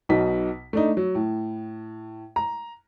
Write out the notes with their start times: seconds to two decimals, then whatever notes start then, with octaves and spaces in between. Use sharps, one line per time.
0.09 B1 B2 D#4 B6
0.73 A3 D4 D#4
0.97 F#3
1.15 A2
2.36 A#5